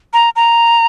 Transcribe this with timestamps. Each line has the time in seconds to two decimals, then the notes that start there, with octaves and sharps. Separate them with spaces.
0.13 A#5
0.36 A#5